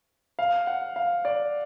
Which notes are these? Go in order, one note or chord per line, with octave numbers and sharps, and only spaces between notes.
F5
F#5
F5
D5